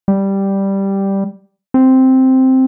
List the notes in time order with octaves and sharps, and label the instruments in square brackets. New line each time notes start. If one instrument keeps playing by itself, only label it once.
[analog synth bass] G3
C4